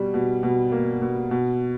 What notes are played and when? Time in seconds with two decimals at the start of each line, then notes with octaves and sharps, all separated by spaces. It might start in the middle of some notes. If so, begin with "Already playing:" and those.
Already playing: B2 G3
0.14 B2
0.43 B2
0.72 A#3
1.02 B2
1.31 B2